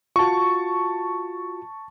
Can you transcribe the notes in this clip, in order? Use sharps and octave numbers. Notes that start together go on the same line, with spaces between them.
F4 F#4 A5 C#6